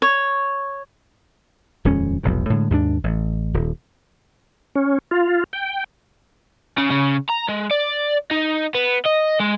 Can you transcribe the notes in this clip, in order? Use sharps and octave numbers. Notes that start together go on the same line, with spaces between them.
C#5
D#1 F2 G#3 C#4
F1 B1 F2 G#2
A2 D3 G#3
D#2 G#2 A3 D4
A1
D#1
C#4
F4
G5
C#3
C#3
A#5
G#3
D5
D#4
B3
D#5
G#3